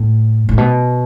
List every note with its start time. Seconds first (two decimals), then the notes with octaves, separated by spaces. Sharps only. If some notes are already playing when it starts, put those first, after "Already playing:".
Already playing: A2
0.49 A2
0.58 B2